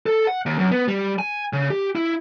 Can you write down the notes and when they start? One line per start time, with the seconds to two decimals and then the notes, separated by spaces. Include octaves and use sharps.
0.06 A4
0.27 F#5
0.46 D#2
0.59 F#2
0.71 B3
0.88 G3
1.19 G#5
1.53 C#3
1.70 G4
1.95 E4